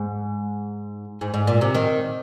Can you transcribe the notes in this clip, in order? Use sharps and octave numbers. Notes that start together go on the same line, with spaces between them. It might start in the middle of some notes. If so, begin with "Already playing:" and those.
Already playing: G#2
G#2
G#2
A#2
C3
D#3